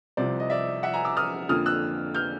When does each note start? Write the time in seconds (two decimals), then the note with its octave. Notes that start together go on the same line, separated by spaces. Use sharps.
0.17 C2 C3 F3 C5 D5
0.40 D#5
0.50 D5 E5
0.83 E5 F#5
0.94 G#5 A#5
1.05 D6 E6
1.17 D#6 F6
1.49 F2 D3 F3 A#3 D#6 F6
1.66 E6 F#6
2.15 F6 G6